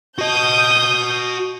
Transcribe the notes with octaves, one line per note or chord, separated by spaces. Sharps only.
F#4 D#5 D#6 G6